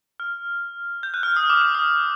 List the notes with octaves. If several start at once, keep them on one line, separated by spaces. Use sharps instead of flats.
F6
G6
F#6
F6
D#6
D6
D6
D#6